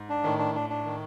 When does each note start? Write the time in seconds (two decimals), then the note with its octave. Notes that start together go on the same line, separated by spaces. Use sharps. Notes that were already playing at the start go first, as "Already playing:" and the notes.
Already playing: G#2
0.09 D4
0.24 A2 D#3
0.39 D4
0.55 D4
0.70 D4
0.85 D#3